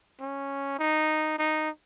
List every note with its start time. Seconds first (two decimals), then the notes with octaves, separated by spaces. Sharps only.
0.20 C#4
0.79 D#4
1.39 D#4